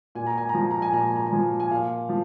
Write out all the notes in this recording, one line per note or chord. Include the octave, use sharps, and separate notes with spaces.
A#2 G#5
A#5
G#5
F3 A#5
G#5
A#5
G#5
A#2 A#5
G#5
A#5
G#5
F3
G#5
A#2 F5
F3